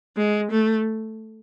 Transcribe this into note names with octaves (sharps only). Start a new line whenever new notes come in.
G#3
A3